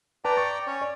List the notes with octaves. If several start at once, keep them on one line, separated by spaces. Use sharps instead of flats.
B4 D5 G5 A5 A#5
C#6 A6
C#4 C#5
D5